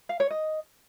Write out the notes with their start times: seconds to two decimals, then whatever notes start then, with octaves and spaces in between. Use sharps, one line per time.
0.09 F5
0.20 C#5
0.31 D#5